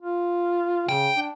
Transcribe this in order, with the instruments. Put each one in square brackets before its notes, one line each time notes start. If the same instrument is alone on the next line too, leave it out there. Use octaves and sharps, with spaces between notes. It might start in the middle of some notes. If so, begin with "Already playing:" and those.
[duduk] F4
[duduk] C#3 [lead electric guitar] G5
[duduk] D4